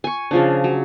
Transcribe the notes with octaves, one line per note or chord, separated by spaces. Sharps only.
G#5 C#6
C#3 F3 D4
F#3